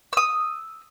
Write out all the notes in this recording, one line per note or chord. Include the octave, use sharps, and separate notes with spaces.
D#6 E6